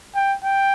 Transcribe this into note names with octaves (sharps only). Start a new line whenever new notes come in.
G5
G5